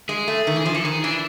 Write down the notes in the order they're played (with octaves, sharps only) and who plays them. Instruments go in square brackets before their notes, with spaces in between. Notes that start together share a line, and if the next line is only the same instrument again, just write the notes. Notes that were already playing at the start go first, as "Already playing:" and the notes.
[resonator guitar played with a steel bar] G#3 [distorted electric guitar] G#4
[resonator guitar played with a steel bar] A3
D#3
E3
F3
[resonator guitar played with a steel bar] E3 [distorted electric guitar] A4
[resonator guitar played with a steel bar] D#3 [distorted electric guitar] G#4
[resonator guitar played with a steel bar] E3 [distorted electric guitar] D4